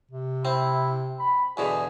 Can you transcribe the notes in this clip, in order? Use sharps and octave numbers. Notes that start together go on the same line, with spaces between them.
C3
C4 E4
B5
E2 B2 D3 G#4